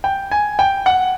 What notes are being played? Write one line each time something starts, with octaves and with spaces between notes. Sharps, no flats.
G5
G#5
G5
F#5